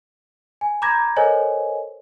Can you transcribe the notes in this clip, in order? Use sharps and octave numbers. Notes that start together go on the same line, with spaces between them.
G#5
A#5 B5 D6 G6 G#6 A#6
A4 A#4 C5 C#5 D#5 G#5